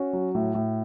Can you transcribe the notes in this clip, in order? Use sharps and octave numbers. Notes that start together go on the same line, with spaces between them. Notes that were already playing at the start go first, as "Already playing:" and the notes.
Already playing: C#4 F#4
F#3
A2
A2